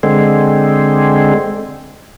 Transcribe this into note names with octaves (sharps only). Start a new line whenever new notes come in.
D3 G#3 C4